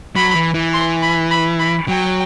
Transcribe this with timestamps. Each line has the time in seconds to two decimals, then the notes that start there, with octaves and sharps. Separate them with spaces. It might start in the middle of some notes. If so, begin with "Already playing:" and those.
0.16 F#3 B5
0.35 E3
0.54 E3
0.73 C6
1.03 B5
1.31 B5
1.59 B5
1.88 F#3 G5